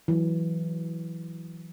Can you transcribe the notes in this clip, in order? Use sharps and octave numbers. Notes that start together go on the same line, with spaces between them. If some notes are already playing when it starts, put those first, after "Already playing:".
E3 F#3